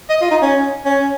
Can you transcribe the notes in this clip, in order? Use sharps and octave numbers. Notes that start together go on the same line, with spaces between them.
D#5
F4
D#4
C#4
C#4